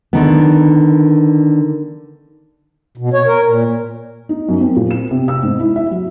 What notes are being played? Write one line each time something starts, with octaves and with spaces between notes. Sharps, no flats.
D3 D#3 B3
B2
C#5
A#4
A#2
D#4
F#2
C4
A#2
E7
C3
E6
G#2
E4
E5
F#3